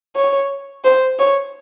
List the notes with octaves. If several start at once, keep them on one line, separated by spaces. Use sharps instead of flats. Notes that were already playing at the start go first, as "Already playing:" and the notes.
C#5
C5
C#5